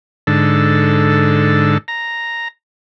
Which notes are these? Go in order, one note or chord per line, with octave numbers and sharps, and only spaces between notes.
G#2 D3 A4
A#5